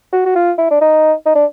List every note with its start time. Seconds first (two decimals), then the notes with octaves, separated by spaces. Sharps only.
0.13 F#4
0.26 F#4
0.35 F4
0.58 E4
0.70 D4
0.81 D#4
1.26 D#4
1.35 D4